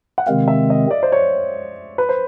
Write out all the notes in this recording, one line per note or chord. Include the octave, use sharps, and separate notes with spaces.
F#5
C3 D#3 G#3 C4 F5
E5
D#5
D5
C5
C#5
B4
C5